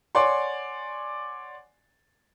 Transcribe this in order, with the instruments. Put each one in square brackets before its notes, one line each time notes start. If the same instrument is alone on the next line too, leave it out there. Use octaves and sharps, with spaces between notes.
[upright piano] C#5 D5 F#5 G#5 C6